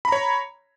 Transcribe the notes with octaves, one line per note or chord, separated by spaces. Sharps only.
C#5 A#5 B5